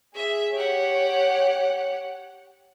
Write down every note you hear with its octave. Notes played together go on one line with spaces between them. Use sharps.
G#4 E5
G4 C#5 F#5